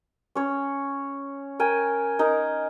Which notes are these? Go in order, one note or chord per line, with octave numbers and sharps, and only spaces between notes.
C#4 C#5
A#4 G5 G#5
D#4 A#4